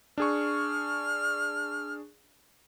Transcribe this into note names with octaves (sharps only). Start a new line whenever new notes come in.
D4 G#4 C#6 F6